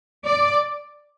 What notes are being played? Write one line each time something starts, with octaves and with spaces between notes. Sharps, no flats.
D5